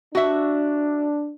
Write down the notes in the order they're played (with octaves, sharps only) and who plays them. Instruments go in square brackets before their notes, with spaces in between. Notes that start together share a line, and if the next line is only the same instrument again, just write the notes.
[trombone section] D4 [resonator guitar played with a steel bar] F#4 E5